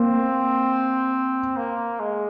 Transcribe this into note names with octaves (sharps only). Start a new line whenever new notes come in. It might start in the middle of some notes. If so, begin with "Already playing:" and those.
Already playing: A#3 C4
A#3
G#3